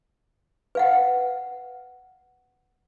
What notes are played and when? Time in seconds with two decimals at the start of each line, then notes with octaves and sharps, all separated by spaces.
0.75 B4 F5 F#5